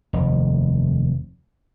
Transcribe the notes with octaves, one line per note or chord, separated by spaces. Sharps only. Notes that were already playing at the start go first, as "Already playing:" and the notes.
F1 D#2